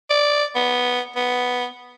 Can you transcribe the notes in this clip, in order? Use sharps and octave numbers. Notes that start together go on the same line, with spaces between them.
D5
B3
B3